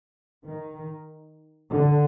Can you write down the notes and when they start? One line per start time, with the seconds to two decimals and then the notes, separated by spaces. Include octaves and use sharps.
0.44 D#3
1.70 D3